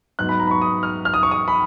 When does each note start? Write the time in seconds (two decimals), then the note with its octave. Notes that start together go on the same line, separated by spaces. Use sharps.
0.19 G#2 F#3 B3 F#6
0.29 B5
0.40 A#5
0.47 B5
0.51 C#6
0.61 D#6
0.83 F6
1.05 F6
1.14 D#6
1.23 C#6
1.31 D#6
1.48 B5